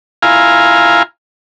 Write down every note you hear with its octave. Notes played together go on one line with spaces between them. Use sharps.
E4 F4 F5 G#5 A#5